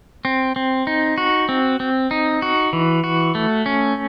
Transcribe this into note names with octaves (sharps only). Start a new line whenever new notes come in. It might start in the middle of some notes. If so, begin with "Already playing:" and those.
C4
C4
D#4
F#4
C4
C4
D#4
F#4
E3
F#4
A3
C#4